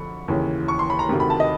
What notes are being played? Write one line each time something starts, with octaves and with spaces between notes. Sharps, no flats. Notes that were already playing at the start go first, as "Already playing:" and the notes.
Already playing: F2 D3 B5 C#6
D#2 C#3 E3
C#6
C6
B5
A#5
D2 C3 D#3
B5
A5
D#5